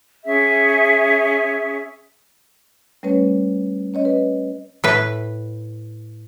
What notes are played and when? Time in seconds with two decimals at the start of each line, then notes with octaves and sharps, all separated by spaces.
0.25 C#4 G#4 E5
3.03 G3 A3 C#4 B4 C#5
3.94 C#4 C#5 D#5
4.05 B4
4.84 A2 B4